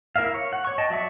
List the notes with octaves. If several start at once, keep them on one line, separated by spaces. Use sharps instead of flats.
E4 A#4 E5 F5
C#5
F#5
C#5 C#6
D#5 G5 A5
F#3 D5 E5 C#6